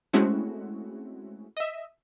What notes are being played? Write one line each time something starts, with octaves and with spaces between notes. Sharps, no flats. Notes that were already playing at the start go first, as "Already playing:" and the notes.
G#3 A3 C4 C#4 E4 F#4
D#5 E5